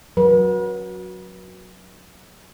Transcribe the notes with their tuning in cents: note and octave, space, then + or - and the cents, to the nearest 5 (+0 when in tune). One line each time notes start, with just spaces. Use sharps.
F#3 -10 B4 -40